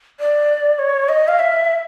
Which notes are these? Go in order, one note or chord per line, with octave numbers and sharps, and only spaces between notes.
D5
C#5
D#5
F5
E5